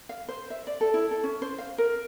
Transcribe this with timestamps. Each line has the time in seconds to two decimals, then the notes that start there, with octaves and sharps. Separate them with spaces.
0.09 F5
0.28 C5
0.50 E5
0.67 D5
0.81 A4
0.94 E4
1.11 A4
1.23 C#4
1.42 C5
1.58 F5
1.78 A#4